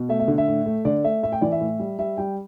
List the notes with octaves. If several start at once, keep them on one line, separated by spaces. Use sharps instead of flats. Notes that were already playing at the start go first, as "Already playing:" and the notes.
Already playing: B2
A3 E5
E5
D3
E5
A2
A3
D3 D5
A3 E5
A2 E5
G5
E3 D5
E5
A2
G3
G3 E5
G3 G5